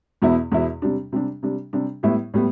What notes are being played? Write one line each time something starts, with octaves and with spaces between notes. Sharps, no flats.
E2 B2 B3 E4
E2 B2 B3 E4
C3 G3 D4
C3 G3 D4
C3 G3 D4
C3 G3 D4
A2 G3 B3 E4
A2 G3 B3